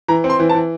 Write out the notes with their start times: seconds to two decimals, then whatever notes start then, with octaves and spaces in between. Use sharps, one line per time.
0.08 E3 A#5
0.24 C4
0.30 C6
0.40 E3
0.49 A5
0.55 E3